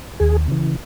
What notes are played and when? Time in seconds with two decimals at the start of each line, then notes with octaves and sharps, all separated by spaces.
0.20 D#2 G#4
0.48 C#3 E3